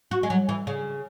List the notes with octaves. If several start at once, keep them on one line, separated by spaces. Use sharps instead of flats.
F#4
G#3
F#3
E3
C#3